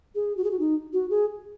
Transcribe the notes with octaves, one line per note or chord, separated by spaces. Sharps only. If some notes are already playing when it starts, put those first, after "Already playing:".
G#4
F#4
G#4
F#4
D#4
F#4
G#4